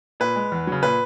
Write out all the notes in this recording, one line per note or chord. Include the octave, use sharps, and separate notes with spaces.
A#2 B4
G#3
E2
C#3 F#3
A#2 B4